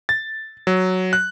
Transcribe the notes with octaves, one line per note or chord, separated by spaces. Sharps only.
A6
F#3
F#6